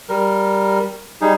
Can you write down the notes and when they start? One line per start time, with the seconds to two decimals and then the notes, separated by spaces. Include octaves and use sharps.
0.09 G3 A#4
1.21 G3 D#4 G#4